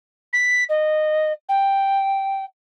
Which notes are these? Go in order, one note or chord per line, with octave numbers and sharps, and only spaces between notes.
B6
D#5
G5